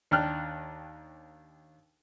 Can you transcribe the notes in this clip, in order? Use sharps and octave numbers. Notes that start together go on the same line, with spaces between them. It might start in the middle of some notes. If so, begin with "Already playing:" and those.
D#2 D4 G5 F6 F#6